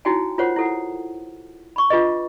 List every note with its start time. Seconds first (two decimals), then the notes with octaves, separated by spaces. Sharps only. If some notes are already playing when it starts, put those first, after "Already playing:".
0.05 D#4 E4 F#4 C#5 G5 G#5
0.38 F4 A#4 C5 C#5 F#5
0.56 E4 A4 F#5
1.76 B5 C#6
1.90 D4 F4 G#4 B4 D#5